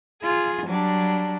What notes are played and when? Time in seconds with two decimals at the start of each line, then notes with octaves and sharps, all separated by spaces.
0.22 F4 G#4
0.67 F#3 G3 D4